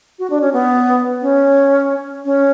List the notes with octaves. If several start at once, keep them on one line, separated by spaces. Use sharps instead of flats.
F#4
D4
C#4
B3
C#4
C#4